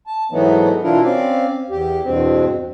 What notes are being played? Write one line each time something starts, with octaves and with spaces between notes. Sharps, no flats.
A5
G#2 E3 F#3 A3 B3 D#4
B2 E3 D4 E4 F4 A#4
C4 C#4 D5 F5
E2 G4
E2 G2 B2 C4